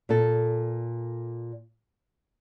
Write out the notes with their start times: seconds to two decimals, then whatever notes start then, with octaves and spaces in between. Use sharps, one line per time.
0.09 A#2 A4